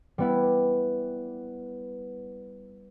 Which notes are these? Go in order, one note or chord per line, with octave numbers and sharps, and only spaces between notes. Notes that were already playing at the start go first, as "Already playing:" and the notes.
G3 B3 E4